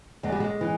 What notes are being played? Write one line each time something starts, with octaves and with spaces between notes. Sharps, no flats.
E2 G#3
G3
G#3
E3